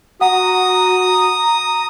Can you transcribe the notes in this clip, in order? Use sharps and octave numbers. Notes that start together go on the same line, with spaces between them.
F#4 F#5 A#5 D#6